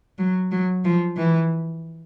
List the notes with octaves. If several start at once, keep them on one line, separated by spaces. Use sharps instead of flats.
F#3
F#3
F3
E3